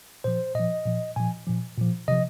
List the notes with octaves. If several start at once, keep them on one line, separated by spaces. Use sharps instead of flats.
A#2 F3 C5
A#2 F3 D#5
A#2 F3
A#2 F3 G#5
A#2 F3
A#2 F3
C3 F3 D#5